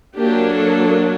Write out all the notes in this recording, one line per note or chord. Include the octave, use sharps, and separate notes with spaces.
F#3 A#3 D4 G4
A4